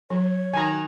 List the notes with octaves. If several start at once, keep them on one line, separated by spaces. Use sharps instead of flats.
F#3 C#5
D#3 F#4 G#5 A#5